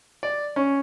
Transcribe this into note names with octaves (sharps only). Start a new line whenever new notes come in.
D5
C#4